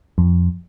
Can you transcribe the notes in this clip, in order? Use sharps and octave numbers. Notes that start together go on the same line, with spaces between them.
F2